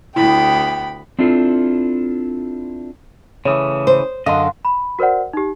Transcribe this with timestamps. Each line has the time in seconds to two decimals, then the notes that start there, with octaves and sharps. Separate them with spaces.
0.16 D2 B3 E4 G5 B5
1.19 C4 D4 E4 F4 A4
3.45 C#3 E3 A3 C#5 D#6
3.87 C5
4.26 F#2 D3 D#5 F5 F#5 C6
4.65 B5
4.99 F#4 A#4 C5 D5 F#5
5.33 D#4 G4